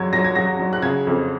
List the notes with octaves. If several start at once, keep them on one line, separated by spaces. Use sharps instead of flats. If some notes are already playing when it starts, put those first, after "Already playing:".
Already playing: F#2 F#3 G#6
F#3 A#6
G#6
F#3 A#6
F#3
F#6
C#3 G#6
F2